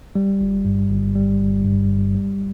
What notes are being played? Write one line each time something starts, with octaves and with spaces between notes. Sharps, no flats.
G3
G1
G2
G1
G3
G1
G2
G1
G3